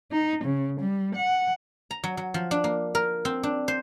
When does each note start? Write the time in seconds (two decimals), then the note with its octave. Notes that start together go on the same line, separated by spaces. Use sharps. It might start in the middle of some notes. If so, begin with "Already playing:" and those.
0.12 D#4
0.44 C#3
0.80 G3
1.15 F#5
1.91 A#5
2.04 F#3
2.17 F#3
2.34 F3
2.51 D4
2.64 A#3
2.95 A#4
3.25 C4
3.43 D4
3.68 C5